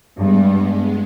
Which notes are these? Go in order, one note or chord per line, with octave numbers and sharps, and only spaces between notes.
G2 G#3 B3